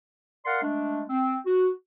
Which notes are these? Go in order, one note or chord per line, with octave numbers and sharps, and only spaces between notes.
A#4 D5 F5 F#5 C6
G#3 A3 D4
C4
F#4